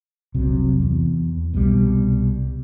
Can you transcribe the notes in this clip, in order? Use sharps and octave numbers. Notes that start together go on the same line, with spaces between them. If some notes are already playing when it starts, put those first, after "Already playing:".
F1 C2 C3 F#3
E2
C2 B2 D3 G3